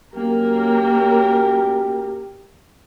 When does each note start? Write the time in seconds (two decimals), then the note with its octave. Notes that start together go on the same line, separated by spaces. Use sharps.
0.15 F#2 A#3 G4 A#4